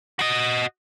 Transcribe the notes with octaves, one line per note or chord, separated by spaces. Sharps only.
F#4 D#5